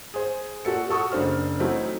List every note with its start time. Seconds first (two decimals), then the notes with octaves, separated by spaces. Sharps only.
0.14 G#4 C5
0.65 A#2 F#4 A4 C#7
0.89 F#4 A4 C#6 D#6
1.11 F#1 D4 C5 F6
1.60 E3 F#3 A3 C4 D#4 E4